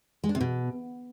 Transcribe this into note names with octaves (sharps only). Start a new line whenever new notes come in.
G#3
D4
C3
B2